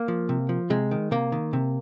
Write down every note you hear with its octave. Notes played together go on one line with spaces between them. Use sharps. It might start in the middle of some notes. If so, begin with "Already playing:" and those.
Already playing: A#3
F3
C3
F3
C3 G#3
D#3
C3 A#3
D#3
C3